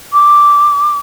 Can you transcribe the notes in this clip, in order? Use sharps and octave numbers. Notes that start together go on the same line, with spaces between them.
D6